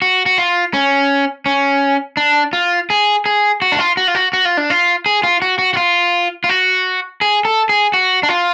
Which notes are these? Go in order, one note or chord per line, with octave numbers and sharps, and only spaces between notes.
F#4
F#4
F4
C#4
C#4
D4
F4
G#4
G#4
F#4
D4
F4
F#4
F4
F#4
F#4
F4
D4
F4
G#4
F4
F#4
F#4
F#4
F4
F4
F#4
G#4
A4
G#4
F#4
D4
F4